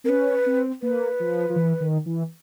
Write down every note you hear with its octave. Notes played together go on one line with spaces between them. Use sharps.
C4 A#4
C#4 B4
C4
A#3 B4
F3
F3
E3
D#3
E3